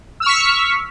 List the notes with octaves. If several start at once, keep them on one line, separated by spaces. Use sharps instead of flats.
C#6 E6 F6 B6